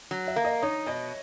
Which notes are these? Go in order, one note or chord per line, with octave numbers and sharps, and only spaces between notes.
F#3
E5
A#3
D#5
D#4 C#5
B2 D#5